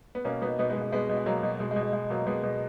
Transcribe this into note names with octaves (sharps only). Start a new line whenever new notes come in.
B3
B2 A#3 C#4
B2 B3 D#4
B2 B3 D#4
G#3 B3
B2
G#3
B2 G#3 B3
B2
G#3
B2 F#3 A#3
B2
B2 G#3
G#3
B2
G#3
B2 G#3
B2 F#3 A#3
B2 G#3 B3
B2